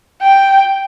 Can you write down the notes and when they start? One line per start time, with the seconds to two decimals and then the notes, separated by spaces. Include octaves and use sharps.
0.22 G5